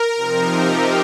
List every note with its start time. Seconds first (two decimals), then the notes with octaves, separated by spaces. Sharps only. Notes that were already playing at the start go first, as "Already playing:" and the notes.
Already playing: A#4
0.15 C3 F3 C4 D#4
0.48 G4